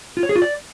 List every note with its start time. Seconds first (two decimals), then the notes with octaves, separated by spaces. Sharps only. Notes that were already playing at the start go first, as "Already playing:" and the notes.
0.17 F4
0.23 C#5
0.29 G#4
0.36 F4
0.42 D5